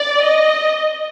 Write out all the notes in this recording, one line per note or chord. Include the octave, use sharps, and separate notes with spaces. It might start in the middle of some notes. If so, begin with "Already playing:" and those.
Already playing: D5
D#5